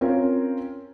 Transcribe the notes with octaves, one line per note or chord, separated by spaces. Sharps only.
C4 C#4 F4 A#4